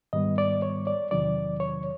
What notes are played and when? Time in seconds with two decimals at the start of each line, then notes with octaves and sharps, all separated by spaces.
0.13 G#2 D#3 G3 B3 D#5
0.38 D5
0.62 C#5
0.87 D5
1.11 E2 C3 D#3 F#3 D5
1.60 C#5